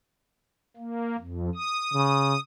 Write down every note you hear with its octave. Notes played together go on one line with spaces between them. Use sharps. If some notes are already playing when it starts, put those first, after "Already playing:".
A#3
F2
D#6
C#3